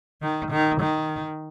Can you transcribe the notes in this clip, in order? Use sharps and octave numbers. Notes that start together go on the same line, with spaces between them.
D#3
D#3
D#3